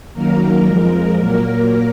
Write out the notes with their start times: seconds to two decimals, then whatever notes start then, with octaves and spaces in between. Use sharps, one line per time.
0.13 F#2 D#3 F#3 A#3 A#4
0.65 F2 F3 G#3
1.15 A#2 F#3 A#3 A#4